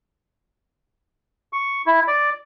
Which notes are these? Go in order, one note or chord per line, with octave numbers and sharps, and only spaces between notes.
C#6
E4
D5